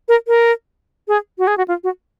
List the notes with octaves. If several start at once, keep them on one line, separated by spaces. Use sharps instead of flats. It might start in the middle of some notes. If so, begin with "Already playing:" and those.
A#4
A#4
G#4
F#4
G#4
F#4
F4
F#4